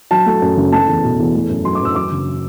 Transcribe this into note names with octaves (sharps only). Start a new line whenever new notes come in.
F#3 A5
A3
F#2
F#1
A3 A5
E2
B2
E2
A3
F#2
F#3 C6
D6
F#2 E6
F#3 D6
F#1